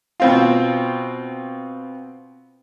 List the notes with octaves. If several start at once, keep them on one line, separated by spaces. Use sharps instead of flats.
B2 C4 F4